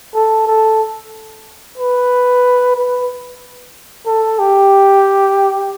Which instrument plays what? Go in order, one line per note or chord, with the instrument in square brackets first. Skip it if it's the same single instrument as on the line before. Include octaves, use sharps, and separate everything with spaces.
[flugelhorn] A4
A4
B4
B4
A4
G4